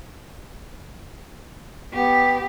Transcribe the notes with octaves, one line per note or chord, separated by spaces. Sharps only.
B3 G4